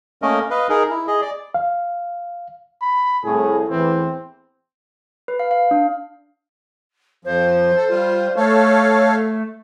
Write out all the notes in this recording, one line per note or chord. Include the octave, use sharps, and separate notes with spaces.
A3 A#3 C#4 A#4 D#5
B4 D#5 F5
D#4 G#4 A#4
E4
G#4 D#5
D5
F5
B5
C2 A2 G#4
E2 A2 E3 C4
B4
F5
F5
D4
F2 F3 C5
A4
G3 F4
A3 A4 C#5 F5